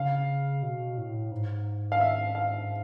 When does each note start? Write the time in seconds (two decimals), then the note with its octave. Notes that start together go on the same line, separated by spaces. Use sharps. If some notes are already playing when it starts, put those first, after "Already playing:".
Already playing: C#3 F5
0.63 B2
0.98 A2
1.31 G#2
1.92 F5
2.00 E5
2.35 F5